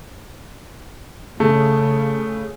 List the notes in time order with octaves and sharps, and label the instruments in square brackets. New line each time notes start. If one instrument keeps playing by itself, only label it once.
[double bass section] C#3 [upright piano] A3